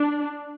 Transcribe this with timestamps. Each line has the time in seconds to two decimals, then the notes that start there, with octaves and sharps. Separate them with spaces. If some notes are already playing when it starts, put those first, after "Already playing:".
Already playing: D4